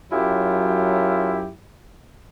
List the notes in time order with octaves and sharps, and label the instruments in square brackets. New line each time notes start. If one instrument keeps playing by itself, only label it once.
[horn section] F#2 F#3 E4 F4 G4